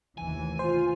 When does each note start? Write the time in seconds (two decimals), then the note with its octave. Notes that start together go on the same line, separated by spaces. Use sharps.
0.18 F1 D#2 E3 G#5
0.59 F4 C5